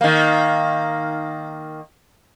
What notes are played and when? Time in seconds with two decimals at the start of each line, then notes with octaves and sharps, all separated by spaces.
0.01 D#3 A#3